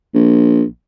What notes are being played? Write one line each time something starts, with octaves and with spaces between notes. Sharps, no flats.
A#1